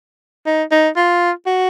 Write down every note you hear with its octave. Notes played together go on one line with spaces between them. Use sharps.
D#4
D#4
F4
F#4